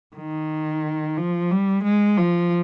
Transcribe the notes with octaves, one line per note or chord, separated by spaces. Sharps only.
D#3
F3
G3
G#3
F3